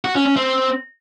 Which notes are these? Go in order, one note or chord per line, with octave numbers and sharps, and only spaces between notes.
F#4
C#4
C#4
C4